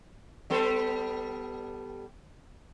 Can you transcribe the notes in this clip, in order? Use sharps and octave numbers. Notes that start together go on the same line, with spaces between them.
G3 B3 A4